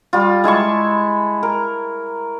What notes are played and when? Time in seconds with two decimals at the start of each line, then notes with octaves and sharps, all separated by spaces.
0.13 G3 F4
0.44 G#3 E4 A5 C#6
1.43 A#4